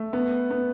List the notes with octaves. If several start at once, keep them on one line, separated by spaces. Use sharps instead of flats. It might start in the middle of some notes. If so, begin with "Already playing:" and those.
Already playing: A3
B3
B3